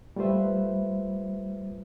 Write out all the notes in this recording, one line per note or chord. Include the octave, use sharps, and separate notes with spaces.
G3 A3 F4 B4 C5 E5